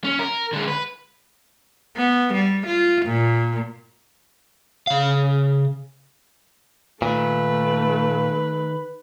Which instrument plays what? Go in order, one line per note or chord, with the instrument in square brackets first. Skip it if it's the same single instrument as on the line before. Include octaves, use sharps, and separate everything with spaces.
[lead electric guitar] C#4
A#4
D3 G#3
B4
[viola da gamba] B3
G3
F4
A#2
[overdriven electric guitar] C#3 F5
[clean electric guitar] A#2 [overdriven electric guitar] D#3 [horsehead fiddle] A3 [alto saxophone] B4